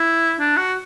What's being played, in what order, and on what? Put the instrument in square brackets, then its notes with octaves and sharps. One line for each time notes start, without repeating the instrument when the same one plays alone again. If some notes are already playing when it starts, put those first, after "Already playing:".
Already playing: [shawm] E4
D4
F#4